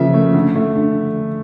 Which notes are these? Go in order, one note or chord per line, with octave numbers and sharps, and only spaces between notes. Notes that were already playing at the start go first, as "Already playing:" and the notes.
Already playing: C#3 F3 A#3 E5
A3
D3
A3
D3